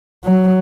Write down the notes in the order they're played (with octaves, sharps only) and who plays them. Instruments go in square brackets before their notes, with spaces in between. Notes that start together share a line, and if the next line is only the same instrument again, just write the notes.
[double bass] F#3